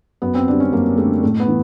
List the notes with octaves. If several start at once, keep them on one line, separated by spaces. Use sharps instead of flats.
F#2 B3
C4
D3 G3 D4
C#4
F#2 A#3
D3 G3 A3
A2 A3
B3
E3